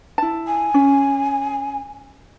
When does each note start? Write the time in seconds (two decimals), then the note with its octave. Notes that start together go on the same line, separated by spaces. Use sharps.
0.18 E4 A5
0.47 G#5
0.74 C#4